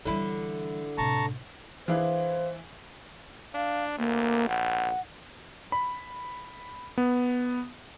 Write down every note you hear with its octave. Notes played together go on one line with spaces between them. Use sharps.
D3 E3 G3 E4
A2 C3 A5 A#5 C#6
E3 D4 E4 G#4 C5 F5
D4 F5
D2 A#3
A#1 F#5
B5
B3